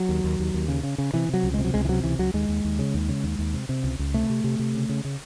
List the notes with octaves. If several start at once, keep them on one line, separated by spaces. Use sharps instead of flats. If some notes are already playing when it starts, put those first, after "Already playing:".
Already playing: F#3
D#2
D#2
D#2
D#2
C#3
C#3
C#3
C3 E3
C3 F#3
C#2
C3 G#3
F#3
C#2 G#3
E3
C3 F#3
C#2 E3
C#2 F#3
D#2 G#3
D#2
D#2
C#3
D#2
C#3
D#2
D#2
C3
C3
C#2
C#2
C3 A3
C3
C3
C3
C#3
C#3
C#3